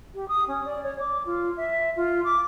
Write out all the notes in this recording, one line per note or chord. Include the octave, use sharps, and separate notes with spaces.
G4
D#6
C#4
D5
C#5
D6
F4
E5
F4
D6